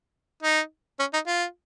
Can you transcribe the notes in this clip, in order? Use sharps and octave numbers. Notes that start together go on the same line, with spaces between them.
D#4
C#4
D#4
F4